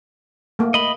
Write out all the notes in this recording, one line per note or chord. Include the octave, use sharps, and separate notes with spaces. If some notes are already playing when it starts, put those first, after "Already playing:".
A3 A#3
D#5 B5